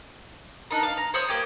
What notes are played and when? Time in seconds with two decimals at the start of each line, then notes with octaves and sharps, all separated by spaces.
0.71 D4 D#4 A#4
0.83 F5
0.97 A#5
1.14 C5 C#5 D#6 F#6
1.28 A#3 G4 G#5